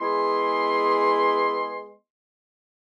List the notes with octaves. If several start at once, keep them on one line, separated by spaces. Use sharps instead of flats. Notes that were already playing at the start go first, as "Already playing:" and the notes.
G#3 B3 E4 G#4 C6